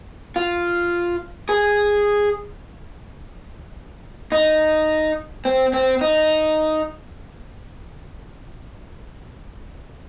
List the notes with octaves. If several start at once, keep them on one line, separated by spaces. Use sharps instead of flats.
F4
G#4
D#4
C4
C4
D#4